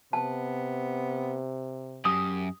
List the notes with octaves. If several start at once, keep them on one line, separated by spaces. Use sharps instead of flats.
C3 B3 A5
F#2 G4 D#6